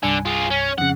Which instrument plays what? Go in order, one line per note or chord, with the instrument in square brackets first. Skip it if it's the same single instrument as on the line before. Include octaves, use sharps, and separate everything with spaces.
[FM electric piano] C2 G2 G#5 [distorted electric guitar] D3
[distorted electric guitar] F4 G#4
C#4
[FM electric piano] F2 C#3 [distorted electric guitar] F#5